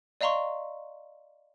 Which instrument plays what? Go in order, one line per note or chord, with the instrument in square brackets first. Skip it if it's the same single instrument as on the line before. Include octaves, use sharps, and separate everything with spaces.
[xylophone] D5 D#5 F5 A#5 C6 C#6